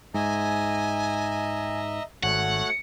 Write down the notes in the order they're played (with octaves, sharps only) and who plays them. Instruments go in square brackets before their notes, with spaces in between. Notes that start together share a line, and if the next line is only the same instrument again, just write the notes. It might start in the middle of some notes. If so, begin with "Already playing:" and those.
[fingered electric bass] G#2 [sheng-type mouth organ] D#5 E5 A#5 [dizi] G#5
[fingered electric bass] G#1 [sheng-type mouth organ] A3 F#4 C#5 [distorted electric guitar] F#5